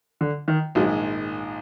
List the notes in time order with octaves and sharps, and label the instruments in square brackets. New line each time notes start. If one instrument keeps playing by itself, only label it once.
[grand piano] D3
D#3
[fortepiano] A#1 G#2 D#3 G#3 [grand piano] F#3